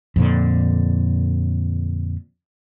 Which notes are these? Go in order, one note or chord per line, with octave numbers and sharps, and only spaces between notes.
F2 A#2 D3